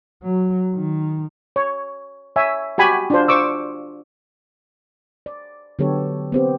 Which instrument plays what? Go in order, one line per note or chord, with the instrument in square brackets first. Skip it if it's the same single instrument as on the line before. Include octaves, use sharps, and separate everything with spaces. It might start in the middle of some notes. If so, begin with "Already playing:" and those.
[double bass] F#3
D#3
[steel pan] C#5
C#5 E5 G#5
F#4 G4 G#5 B5
D4 F4 C5
C5 C#6 D6 E6
[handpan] D5
D3 F#3 B3 G4 A4 C#5
B3 C4 G4